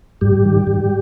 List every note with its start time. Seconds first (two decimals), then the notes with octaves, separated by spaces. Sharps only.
0.21 G#2 G3 G4
0.45 D#3
0.67 G#2